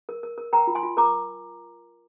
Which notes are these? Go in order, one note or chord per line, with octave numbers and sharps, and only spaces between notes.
A#4
A#4
A#4
A#4 G5 A#5
F4
G#5 C6
F4
A#4 A#5 D6